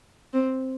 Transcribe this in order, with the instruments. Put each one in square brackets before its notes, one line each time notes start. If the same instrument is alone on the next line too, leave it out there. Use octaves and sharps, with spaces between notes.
[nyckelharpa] C4